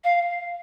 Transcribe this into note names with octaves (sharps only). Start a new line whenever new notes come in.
F5